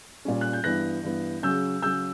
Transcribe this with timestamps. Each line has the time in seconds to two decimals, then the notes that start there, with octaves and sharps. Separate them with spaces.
0.25 A#2 G3 C#4
0.41 F#6
0.53 G6
0.64 G2 E3 B3 F#6 A#6
1.03 G2 E3 B3
1.43 C#3 F#3 C#4 E6 G6
1.82 C#3 F#3 C#4 E6 G6